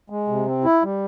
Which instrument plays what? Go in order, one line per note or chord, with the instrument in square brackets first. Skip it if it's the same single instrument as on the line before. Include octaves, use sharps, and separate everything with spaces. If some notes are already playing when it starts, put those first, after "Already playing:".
[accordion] G#3
C3
C4
E4
G3